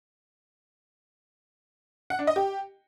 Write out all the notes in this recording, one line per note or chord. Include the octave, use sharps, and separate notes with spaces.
F#5
D4
D#5
G4